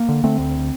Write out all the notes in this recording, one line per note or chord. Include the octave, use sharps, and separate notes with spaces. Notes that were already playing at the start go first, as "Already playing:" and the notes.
Already playing: A#3
D3
D3 A3 C4
D2